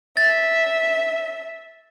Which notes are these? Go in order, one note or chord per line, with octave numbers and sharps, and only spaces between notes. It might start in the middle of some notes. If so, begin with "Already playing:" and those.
E5 A6